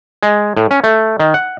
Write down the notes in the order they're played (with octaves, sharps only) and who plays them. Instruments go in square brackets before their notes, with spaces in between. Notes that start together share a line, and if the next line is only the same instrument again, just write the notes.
[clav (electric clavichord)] G#3
A2
C#4
A3
D#3
F#5